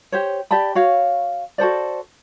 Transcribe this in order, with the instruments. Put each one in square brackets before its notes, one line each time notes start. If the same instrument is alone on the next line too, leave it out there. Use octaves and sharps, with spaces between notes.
[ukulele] G4 C5 C#5
G4 D5 A5 B5
F#4 C#5 F5
F#4 A4 C5 D5